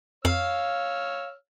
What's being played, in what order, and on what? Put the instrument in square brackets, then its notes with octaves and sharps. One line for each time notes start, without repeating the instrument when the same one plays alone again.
[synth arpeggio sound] F2 [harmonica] C#5 E6 F6 [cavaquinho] F5